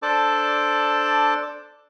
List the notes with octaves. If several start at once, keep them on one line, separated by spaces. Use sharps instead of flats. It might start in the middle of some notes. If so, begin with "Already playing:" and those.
D4 A4 C5 D5 A5 D6